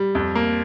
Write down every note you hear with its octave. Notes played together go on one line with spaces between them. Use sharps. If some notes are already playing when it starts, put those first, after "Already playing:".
Already playing: G3
F2
A#3